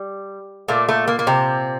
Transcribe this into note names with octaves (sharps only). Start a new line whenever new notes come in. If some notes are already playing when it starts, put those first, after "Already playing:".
Already playing: G3
A#2 A3 A#3
A3
A#3
A#3
C3 C4